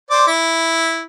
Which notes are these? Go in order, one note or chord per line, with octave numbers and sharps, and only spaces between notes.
C5 D5
E4